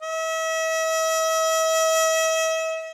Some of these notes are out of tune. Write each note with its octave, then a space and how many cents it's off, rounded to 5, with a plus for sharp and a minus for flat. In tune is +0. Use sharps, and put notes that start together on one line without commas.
E5 -40